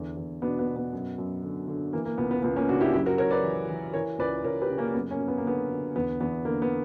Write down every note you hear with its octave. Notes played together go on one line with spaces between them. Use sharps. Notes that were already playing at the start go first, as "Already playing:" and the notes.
Already playing: E2 D3
E2
B2 B3 D4
B3
B2
B3
F#2
F#2
D3
D3
E3 A#3
A#3
C#2 B3
B3
C#2 B3
A#3 C#4
C#3 D4 F#4
E4 G4
F#2 E4 G4
F#4 A#4
F#2 A#4 C#5
B4 D5
E3
E3
E3 A#4 C#5
C#2 B4 D5
C#2 A#4 C#5
G4 B4
C#3
A#3 C#4
F#2 B3
A#3 C#4
F#2
B3
A#3
D3 B3
D3
E2 B3
E2 B3
D3 A#3
B3